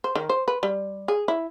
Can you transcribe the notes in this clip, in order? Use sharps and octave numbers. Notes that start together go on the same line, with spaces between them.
C5
D#3
C5
B4
G3
G#4
E4